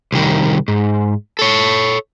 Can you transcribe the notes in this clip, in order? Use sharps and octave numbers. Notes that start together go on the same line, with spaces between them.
C2 D#3
G#2
A4 C#5